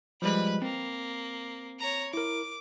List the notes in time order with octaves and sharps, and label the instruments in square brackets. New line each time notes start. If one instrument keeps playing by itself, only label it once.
[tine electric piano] F3 G3 G#3 [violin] B4 B5
[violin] A#3 [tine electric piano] C4
[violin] C#5 A#5
[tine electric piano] E4 A#4 [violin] D6